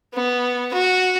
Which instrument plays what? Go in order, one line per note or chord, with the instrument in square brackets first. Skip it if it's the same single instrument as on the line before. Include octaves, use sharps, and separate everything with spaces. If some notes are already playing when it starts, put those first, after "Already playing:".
[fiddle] B3
F#4